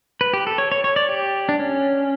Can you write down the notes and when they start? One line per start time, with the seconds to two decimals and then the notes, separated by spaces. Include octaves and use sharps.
0.21 B4
0.33 G4
0.47 A4
0.58 C#5
0.72 C#5
0.84 C#5
0.96 D5
1.09 G4
1.49 D4
1.59 C#4